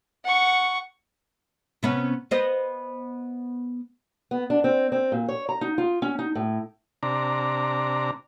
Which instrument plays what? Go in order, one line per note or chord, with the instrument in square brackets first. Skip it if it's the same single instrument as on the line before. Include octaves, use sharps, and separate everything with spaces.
[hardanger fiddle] F#5 C#6
[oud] C3 B3 C#4
B3 C5 D#5
[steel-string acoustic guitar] B3
D4
C4
C4
A#2
C#5
A#5
D#4
F4
C#4
D#4
A2
[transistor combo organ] C3 D4 A#5